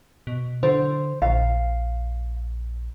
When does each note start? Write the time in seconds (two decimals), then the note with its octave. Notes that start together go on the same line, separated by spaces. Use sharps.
0.27 B2
0.63 D3 C5
1.22 A#1 F5